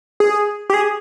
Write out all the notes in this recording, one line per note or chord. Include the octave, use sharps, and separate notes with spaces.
G#4
G4
G#4